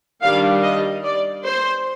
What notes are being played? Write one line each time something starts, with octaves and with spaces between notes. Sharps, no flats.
D#3 G3 D4 F5
D#5
D5
C5